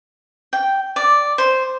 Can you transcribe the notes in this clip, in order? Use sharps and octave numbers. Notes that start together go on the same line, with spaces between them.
G5
D5
C5